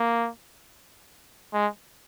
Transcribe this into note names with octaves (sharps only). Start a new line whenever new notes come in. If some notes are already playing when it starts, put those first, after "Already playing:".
Already playing: A#3
G#3